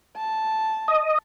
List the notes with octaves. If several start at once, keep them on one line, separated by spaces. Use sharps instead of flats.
A5
D#5